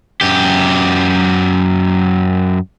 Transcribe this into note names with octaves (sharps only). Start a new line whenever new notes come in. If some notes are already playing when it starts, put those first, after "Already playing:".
F#2 G4